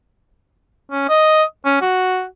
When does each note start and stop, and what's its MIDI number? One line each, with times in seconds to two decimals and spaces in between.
0.92 1.06 61
1.09 1.43 75
1.65 1.77 61
1.82 2.25 66